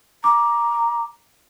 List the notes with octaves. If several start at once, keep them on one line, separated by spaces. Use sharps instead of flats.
A#5 D6